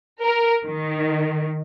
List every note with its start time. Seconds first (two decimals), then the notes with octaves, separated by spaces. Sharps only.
0.23 A#4
0.65 D#3